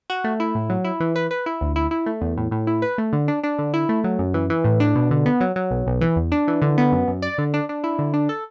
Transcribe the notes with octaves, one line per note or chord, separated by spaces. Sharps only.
F#4
A3
E4
A2
F#3
E4
E3
B4
B4
E4
D2
E4
E4
A3
E2
A2
A2
E4
B4
A3
D3
D4
D4
D3
E4
A3
F#3
F#2
E3
E3
A2
D4
B2
D3
B3
F#3
F#3
B1
B1
E3
E2
D4
E3
D3
B3
F#2
F#2
D5
D3
D4
D4
E4
D3
D4
A4